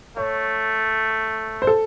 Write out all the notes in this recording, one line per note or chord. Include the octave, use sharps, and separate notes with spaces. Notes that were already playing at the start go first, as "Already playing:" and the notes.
A3 C#5
C5
A4